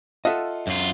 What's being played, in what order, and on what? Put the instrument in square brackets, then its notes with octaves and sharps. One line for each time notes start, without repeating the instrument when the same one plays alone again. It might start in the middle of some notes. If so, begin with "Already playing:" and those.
[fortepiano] F4 A4 F#5 [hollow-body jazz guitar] D#5 E5
[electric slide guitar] F#2 F4